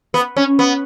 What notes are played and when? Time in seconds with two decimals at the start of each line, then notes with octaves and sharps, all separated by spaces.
0.14 B3
0.37 C#4
0.59 B3